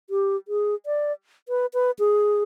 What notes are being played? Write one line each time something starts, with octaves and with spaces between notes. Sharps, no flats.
G4
G#4
D5
B4
B4
G#4